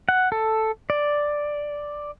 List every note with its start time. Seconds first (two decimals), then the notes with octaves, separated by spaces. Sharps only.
0.09 F#5
0.32 A4
0.90 D5